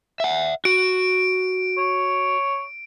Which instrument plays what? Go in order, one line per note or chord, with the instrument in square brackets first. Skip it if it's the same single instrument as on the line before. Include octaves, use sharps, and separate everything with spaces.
[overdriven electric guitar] E5 F#5
[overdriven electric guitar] F#4 [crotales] D7
[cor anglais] C#5